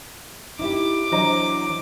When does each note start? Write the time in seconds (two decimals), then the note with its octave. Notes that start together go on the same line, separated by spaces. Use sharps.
0.59 D#4 E4 G4 D6
1.12 E3 F#3 D4 C5 D#5 A#5